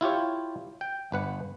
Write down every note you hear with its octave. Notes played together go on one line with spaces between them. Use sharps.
E4 F4 G4 C#5
G5
G1 B4 F#5